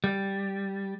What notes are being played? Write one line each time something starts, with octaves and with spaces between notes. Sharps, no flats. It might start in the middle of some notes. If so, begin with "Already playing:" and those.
G3